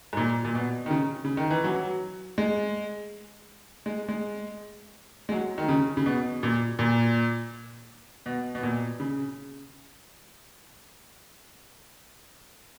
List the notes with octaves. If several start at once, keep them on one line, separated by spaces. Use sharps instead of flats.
G#2
A#2
A#2
B2
D#3
C#3
C#3
D#3
E3
F#3
G#3
G#3
G#3
G#3
F#3
D#3
C#3
C#3
B2
A#2
A#2
B2
B2
A#2
C#3